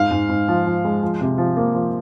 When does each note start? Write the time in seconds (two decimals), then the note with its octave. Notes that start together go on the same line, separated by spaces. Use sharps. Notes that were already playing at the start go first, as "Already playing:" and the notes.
Already playing: G#2 F5
0.11 G#2
0.29 G#2
0.48 F3
0.66 F3
0.85 G#3
1.03 F3
1.21 C3
1.38 F3
1.57 A#3
1.74 F3